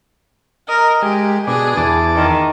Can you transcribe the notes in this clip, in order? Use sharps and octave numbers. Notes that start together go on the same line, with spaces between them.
A#4 D#5
G#3 G4
B2 D4 G#4
E2 A5 D6
D#3